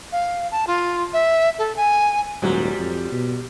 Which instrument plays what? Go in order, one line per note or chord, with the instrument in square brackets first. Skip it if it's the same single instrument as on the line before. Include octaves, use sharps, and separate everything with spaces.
[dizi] F5
A5
F4
E5
A4
G#5
[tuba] D#1 [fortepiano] G#2 F#3 [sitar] G3
[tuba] F2
B2